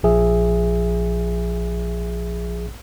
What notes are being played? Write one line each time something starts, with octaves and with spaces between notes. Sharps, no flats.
A#1 F3 G#4 E5